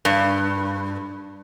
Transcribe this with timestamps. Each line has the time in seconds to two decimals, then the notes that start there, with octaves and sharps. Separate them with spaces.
0.05 G2